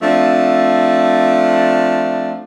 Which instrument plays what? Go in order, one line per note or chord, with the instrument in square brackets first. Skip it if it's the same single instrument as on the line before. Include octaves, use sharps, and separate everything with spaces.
[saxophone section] F3 A3 C4 D4